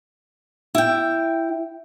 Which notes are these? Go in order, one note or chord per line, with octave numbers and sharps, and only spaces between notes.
E4 G5